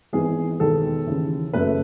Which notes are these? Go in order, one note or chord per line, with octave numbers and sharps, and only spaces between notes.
G#1 G#2 E3 B3 G#4
E1 D#2 D#3 G#3 B3 A4
D#2 C#3 E3
F#1 F#2 C#3 F#3 A3 B4